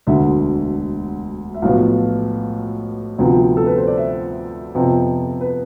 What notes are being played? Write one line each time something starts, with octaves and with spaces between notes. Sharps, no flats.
E1 D2 D3 E5
E5
B1 A2 F3 B3 F5
D2 C3 F3 B3
A4
B4
C5
D5
E5
F2 C3 F3 B3
B4